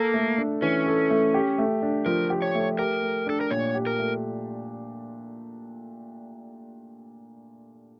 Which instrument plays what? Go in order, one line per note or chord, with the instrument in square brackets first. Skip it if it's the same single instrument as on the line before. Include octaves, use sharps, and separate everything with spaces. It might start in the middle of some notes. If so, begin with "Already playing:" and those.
Already playing: [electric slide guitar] A#3 [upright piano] A4
[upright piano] A3
D4
[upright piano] E3 [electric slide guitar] C#4
[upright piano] A4
A3
G4
A3
D4
[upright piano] F3 [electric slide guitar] A#4
[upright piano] G4
[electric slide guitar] C#5
[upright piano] A3
[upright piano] G4 [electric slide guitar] A#4
[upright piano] A3
[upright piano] D4 [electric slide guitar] A4
[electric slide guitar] A#4
[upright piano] A#2 [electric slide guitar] C#5
[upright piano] G4
[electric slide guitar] A#4
[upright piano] A3